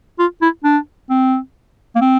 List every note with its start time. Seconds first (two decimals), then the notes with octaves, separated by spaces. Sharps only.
0.19 F4
0.42 E4
0.64 D4
1.10 C4
1.95 A#3
2.01 C4